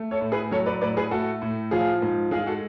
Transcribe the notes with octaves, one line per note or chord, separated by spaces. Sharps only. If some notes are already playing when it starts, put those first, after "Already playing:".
Already playing: A3
A4 C#5
A2
G#4 B4
F#3 A4 C#5
B4 D5
A2 B4 D5
G#4 B4
A3 F#4 A4
A2
F3 F4 G#4
G#2
G#3 F4 G#4
F#4 A4